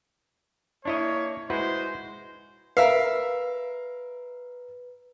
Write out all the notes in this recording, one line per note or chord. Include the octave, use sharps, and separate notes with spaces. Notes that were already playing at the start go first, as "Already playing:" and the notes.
A#3 D4 E4 C#5 D#5
G#3 E4 F#4 B4 C5
A#4 B4 E5 F5